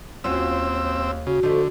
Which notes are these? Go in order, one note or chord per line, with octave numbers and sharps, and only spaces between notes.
D#2 C4 C#4 F4 F#4 E6
C#3 F#4
D3 F3 A3 D#5